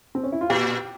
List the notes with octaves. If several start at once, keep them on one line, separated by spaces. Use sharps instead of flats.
C4
C#4
E4
F4
A#2 G4